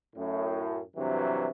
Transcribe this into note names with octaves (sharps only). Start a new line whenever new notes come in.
F#2 A2
G2 C3 E3 F#3